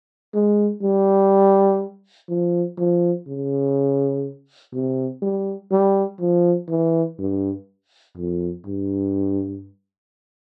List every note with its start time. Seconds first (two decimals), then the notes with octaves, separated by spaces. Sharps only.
0.34 G#3
0.83 G3
2.29 F3
2.78 F3
3.27 C#3
4.73 C3
5.22 G3
5.71 G3
6.20 F3
6.69 E3
7.19 G2
8.17 F2
8.66 G2